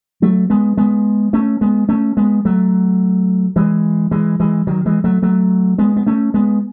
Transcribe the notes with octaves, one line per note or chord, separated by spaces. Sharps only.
F#3 A3
G#3 B3
G#3 B3
A3 C#4
G#3 B3
A3 C#4
G#3 B3
F#3 A3
E3 G#3
E3 G#3
E3 G#3
D#3 F#3
E3 G#3
F#3 A3
F#3 A3
G#3 B3
B3
A3 C#4
G#3 B3